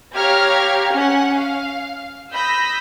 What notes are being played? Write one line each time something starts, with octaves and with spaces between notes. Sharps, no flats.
G4 C#5 F5 A#5 F6 G#6
C#4 F#5
F5
B5 D#6 E6 G6 A#6 B6